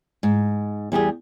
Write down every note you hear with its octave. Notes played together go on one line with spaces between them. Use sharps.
G#2
E2 G3 G4 G#4